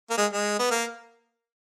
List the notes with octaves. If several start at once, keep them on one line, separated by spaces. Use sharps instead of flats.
A#3
G#3
G#3
B3
A#3